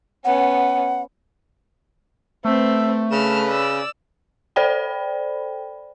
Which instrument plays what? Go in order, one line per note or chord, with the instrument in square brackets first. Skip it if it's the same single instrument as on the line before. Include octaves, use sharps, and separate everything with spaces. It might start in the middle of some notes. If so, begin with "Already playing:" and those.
[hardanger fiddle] B3 C#4 [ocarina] F#5
[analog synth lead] A3 [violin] C4 B4 [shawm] E5
[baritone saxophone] C#3 [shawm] B4 [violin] F6 E7
[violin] D5 E6
[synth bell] A4 C5 D5 G5 B5